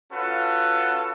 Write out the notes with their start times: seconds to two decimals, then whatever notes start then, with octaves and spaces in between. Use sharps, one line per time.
0.12 C#4 F4 F#4 A4 B4 F#5